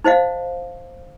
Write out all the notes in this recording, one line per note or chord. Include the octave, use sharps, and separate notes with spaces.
D#4 C5 D#5 F5